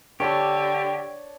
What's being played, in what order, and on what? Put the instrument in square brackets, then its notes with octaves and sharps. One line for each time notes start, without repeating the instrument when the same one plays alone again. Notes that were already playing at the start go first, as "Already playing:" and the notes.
[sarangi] D3 [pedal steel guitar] G4 [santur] C#5 A5